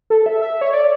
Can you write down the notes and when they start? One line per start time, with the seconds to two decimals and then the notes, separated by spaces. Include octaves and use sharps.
0.10 A4
0.26 E5
0.41 E5
0.61 C#5
0.74 D5